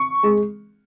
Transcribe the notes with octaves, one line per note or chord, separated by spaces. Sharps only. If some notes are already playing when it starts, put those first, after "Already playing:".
Already playing: C#6
G#3